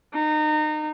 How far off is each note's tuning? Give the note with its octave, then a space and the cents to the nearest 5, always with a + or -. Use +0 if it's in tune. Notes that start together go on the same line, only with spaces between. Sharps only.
D#4 -25